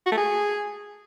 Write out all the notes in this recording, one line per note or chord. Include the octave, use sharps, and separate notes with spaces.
F#4
A3
G#4